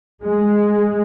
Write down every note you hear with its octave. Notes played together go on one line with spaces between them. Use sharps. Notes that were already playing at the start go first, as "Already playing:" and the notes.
G#3